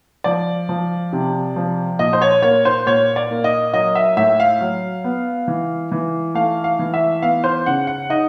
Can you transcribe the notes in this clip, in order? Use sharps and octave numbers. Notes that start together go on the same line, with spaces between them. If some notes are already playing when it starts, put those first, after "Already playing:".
F3 D5
F3
C3
F3
A#2 D#5
C5
C#5
A#3 C#5
C5
A#2 C#5
D5
A#3
D#5
F#3 D#5
E5
A2 E5
F5
F#3
B3
E3
E3
A3 F5
F5
E3
E5
B3 F5
C5
C#3 F#5
F#5
D#4 D#5